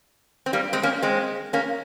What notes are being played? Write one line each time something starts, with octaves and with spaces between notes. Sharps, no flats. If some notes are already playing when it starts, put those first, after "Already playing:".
C4
G3 A#3
G#3 C4
A#3 C#4
G#3 C4
A#3 C#4